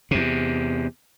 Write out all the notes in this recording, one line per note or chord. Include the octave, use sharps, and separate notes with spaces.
E2 C3